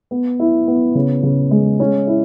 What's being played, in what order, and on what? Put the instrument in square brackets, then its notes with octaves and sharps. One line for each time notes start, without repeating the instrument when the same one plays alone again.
[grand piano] B3
E4
B3
C#3
C#3
G#3
C#4
E4